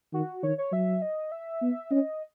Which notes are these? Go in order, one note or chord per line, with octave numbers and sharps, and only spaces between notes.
D#3 F#4
D#3 C#5
C#5
F#3 E5
D#5
E5
B3
C#4 D#5